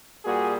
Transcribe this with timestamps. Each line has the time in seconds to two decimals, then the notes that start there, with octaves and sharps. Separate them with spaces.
0.24 A#2 G3 A#3 F#4 G#4